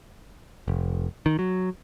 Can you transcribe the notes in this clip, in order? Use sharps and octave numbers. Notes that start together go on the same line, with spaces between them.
F1
D#3
F#3